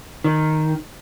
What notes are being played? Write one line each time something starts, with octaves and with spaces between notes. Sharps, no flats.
D#3